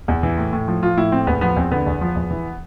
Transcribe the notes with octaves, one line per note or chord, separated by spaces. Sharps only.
E2
E3
A2
A2
F3
F3 F4
A2 E4
A2 C4
E2 B3
F3 B3
E2 C4
D3 B3
E2
F3
E2
E3